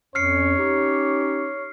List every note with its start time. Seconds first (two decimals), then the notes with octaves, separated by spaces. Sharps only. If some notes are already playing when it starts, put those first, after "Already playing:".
0.15 F2 C#4 C#5 F6 C7 C#7
0.58 C#4 D#4 G4